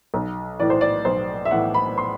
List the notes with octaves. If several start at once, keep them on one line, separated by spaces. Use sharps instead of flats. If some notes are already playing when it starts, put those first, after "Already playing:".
B1
A2 E3 D5
C5
D5
B1 C5
E5
A2 E3 F#5
B5
C6